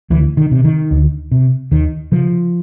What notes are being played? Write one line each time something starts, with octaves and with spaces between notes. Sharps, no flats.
D2 E3
D#3
C3
D#3
D2
C3
D#2 D#3
C#3 F3